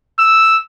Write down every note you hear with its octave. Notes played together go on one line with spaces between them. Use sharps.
E6